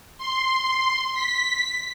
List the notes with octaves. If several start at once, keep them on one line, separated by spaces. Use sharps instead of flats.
C6
B6